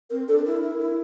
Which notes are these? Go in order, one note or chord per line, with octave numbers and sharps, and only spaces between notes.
C4 A#4
D4 A4
E4 A#4
E4
E4